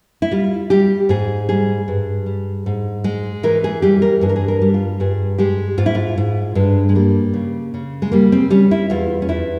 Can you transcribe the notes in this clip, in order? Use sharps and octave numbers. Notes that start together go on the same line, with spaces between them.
E4
G3 F4
G3 G4
G#2 G#4
G3 G#4
G2
G3
G#2
G#3
E3 A#4
G#4
G3 G4
A#4
G2 G#4
A#4
G#4
A#4
G3
F4
G2 G#4
G#3 G4
G#2 F4
E4
F4
G#2
G2 G#3
G#3
G3 A#3
C#3
C#3
G#3
G3 A#3
C4
G3 C#4
E4
E2 F4
C#4
E2 E4